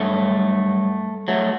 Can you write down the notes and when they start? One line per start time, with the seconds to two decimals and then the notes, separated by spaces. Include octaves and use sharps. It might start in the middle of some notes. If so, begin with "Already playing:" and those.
Already playing: G2 F#3 A3
1.28 F#3 A3